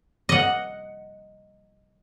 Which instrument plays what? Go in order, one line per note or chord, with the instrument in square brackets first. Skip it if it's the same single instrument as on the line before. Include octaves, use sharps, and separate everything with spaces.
[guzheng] D#5 F#5